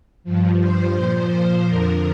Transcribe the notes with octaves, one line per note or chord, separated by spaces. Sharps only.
G2 F3
C5
A#2 F3
F2 D3 F3 A#4